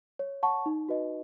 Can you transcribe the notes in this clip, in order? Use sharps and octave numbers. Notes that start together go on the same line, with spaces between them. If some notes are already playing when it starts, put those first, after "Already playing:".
C#5
F#5 A5 C#6
D#4
F#4 B4 D#5